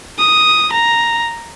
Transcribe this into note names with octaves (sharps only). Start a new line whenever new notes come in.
D#6
A#5